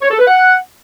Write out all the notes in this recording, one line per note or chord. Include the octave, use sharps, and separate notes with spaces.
C#5
A4
B4
F#5